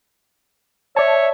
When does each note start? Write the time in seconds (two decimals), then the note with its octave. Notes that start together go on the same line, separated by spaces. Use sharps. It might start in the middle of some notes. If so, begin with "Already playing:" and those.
0.96 C#5 D5 E5 A5